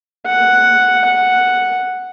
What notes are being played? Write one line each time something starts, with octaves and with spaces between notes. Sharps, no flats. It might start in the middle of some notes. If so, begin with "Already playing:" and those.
F#5
F#5